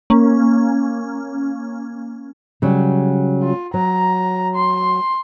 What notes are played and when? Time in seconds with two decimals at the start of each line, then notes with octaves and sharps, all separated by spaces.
0.10 A#3 C#4
2.62 C#3 F#3 G3
3.43 F4
3.74 F#3 A#5
4.55 C6